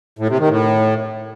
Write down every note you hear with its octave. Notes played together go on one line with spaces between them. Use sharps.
A2
C3
D#3
A2